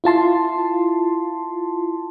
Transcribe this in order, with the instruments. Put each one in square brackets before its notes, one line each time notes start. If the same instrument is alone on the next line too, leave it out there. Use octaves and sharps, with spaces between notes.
[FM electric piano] E4 F4 A5 C6